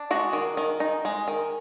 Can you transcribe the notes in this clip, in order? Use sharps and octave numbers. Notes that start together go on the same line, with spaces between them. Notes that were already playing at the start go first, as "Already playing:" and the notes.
Already playing: D4
G#3 F#4
D#3
D#3
D#4
G#3
D#3